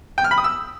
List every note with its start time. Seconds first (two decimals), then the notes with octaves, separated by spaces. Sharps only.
0.18 G5
0.24 F6
0.31 B5
0.38 D#6
0.44 E6